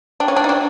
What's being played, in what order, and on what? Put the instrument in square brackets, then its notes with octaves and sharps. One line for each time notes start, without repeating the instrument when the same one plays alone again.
[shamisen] D4 [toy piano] G5
[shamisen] C#4
[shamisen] D4 [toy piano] G5
[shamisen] D#4
[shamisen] D4 [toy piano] D5